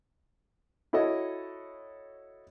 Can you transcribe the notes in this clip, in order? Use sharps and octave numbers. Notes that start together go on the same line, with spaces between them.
E4 F#4 A4 C#5 D#5